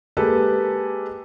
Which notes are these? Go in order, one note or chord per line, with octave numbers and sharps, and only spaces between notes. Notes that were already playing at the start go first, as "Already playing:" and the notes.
G#3 A#3 G4 A4 B4